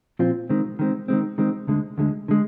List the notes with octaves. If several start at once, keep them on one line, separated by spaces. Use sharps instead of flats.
A#2 F3 C4 F4
D#3 G#3 C4
D#3 G#3 C4
D#3 G#3 C4
D#3 G#3 C4
D2 D3 G#3
D2 D3 G#3
D3 G#3